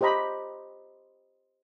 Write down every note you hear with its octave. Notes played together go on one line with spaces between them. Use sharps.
G4 C5 D#5 A#5 B5